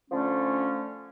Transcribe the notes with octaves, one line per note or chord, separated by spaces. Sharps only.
D3 F3 A3 C#4